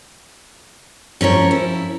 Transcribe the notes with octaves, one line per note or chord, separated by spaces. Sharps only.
F3 C#4 A#4 C#5
E4